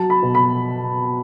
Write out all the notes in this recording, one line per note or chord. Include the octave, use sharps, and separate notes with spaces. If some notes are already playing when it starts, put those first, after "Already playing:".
Already playing: F#3 A5
B5
B2
B5